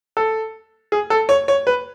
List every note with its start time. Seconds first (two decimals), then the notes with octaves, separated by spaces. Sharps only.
0.17 A4
0.92 G#4
1.10 A4
1.29 C#5
1.48 C#5
1.67 B4